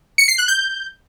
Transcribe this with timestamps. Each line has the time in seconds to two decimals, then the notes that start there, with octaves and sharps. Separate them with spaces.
0.18 C#7
0.28 C7
0.38 F#6
0.48 G6